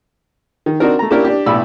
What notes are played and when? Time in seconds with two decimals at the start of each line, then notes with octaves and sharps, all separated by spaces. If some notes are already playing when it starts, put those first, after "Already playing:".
0.66 D#3
0.80 C4 D4 D#4 F#4 A#4
0.99 A3 A#5
1.11 A#3 C#4 D4 E4 G4 A#4
1.24 D4 G4
1.46 B1 A2 D5 B5 E6